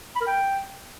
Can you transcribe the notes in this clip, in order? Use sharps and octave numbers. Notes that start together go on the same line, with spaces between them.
B5
A#4
G5